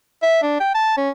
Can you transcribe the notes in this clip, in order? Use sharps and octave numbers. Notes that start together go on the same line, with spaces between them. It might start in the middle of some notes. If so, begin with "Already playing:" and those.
E5
D4
G5
A5
C#4